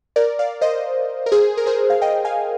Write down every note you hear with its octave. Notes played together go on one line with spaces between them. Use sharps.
A#4 D5
D5 F5
C5 D#5
A#4
G#4 C5
A#4
G#4 C5
F5
D#5 G5
F5 G#5